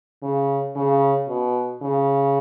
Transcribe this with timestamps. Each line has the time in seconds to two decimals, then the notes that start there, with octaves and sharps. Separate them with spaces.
0.23 C#3
0.76 C#3
1.28 B2
1.82 C#3